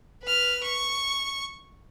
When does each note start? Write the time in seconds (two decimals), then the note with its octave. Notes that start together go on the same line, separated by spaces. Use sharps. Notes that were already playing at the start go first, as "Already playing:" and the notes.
0.23 B4 F6
0.63 C#6